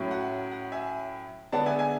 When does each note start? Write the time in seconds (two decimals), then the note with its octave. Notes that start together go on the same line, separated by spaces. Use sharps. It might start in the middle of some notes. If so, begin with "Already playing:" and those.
Already playing: A2 F#3 C#4 E4
0.11 F#5
0.51 F#5
0.72 E5 G#5
1.52 D3 G#3 B3 D4 F#5 A5
1.66 E5 G#5
1.79 E5 G#5